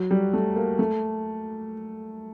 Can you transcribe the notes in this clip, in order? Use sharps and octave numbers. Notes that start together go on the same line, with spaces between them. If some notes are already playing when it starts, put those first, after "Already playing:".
Already playing: F#3
G3
A3
A#3
A3